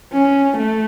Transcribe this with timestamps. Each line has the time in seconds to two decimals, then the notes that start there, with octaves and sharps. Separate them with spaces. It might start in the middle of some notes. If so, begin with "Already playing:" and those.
0.13 C#4
0.57 A3